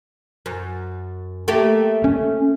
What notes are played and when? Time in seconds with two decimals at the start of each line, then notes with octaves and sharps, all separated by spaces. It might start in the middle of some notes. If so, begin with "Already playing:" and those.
0.46 F#2
1.48 A3 A#3 G4
2.04 C#4